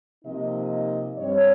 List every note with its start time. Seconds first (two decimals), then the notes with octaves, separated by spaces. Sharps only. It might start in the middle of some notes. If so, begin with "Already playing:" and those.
0.24 C3 F3 A#3 D#4 D#5
1.18 G2 G3 C4 C#5